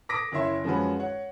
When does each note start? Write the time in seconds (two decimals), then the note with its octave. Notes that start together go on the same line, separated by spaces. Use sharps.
0.09 D6 D#6 A#6 B6 D7
0.32 F#1 E4 C#5 E5 C6
0.64 F#2 F3 G#3 C#4 F#4 B4
0.99 C#5 F#5